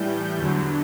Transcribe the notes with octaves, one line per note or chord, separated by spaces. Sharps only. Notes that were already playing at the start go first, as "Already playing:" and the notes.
Already playing: A2 E3 G3 G6
E2 D3 F#3